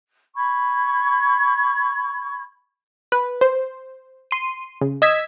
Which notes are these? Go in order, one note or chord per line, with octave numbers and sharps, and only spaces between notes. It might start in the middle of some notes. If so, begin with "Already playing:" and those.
B5 C#6 G#6
B4
C5
C6 D#7
C#3
D#5 E6 G#6 B6